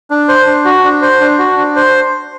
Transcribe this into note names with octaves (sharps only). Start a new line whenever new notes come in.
D4
C5
D4
F#4
D4
C5
D4
F#4
D4
C5